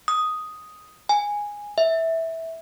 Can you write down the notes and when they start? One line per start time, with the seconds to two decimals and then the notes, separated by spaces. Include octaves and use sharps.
0.08 D#6
1.09 G#5
1.78 E5